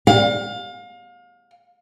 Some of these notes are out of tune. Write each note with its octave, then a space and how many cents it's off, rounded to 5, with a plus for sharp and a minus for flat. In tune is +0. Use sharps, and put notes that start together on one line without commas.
F5 +30